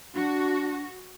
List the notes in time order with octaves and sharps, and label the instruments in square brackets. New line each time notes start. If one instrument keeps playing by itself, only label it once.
[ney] D4 [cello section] F#4